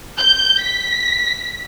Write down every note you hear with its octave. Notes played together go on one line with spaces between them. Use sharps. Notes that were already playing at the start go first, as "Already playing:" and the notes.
G6
B6